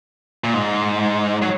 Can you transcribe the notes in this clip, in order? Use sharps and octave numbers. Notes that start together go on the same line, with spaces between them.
A#2
G#2
F#3